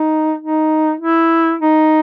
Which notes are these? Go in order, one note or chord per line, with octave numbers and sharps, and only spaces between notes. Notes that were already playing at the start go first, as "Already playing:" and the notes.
Already playing: D#4
D#4
E4
D#4